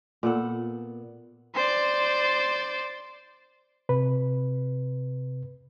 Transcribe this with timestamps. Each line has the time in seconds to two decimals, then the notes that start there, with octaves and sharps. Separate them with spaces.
0.23 A#2 B3 A4 F#5
1.55 C5 D5
3.89 C3 B4